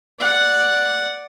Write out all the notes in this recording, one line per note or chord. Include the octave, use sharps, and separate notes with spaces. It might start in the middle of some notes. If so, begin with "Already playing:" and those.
D5 F#5